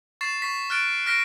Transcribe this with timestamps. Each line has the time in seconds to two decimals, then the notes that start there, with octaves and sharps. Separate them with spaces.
0.21 C#6 A6 C7 E7
0.42 C#6 B6
0.70 F6 F#6 A6 D7
1.06 F6 F#6 A#6 B6 D7